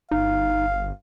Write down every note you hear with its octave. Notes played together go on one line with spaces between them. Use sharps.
G1 D#4 F5